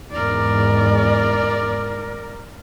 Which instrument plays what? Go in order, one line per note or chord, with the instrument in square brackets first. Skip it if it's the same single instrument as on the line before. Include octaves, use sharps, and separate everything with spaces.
[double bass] E2 G#2 [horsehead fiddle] A#4 D5